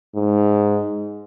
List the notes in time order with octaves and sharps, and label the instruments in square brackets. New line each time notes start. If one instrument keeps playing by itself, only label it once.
[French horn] G#2